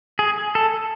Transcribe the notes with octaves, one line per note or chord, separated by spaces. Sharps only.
G#4
A4